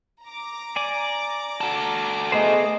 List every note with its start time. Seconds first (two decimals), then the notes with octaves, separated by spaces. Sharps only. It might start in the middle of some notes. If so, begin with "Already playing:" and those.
0.24 A#5 D6
0.76 D5 G#5
1.61 F#4 A4
2.32 A3 B3 G#4 C5 D#5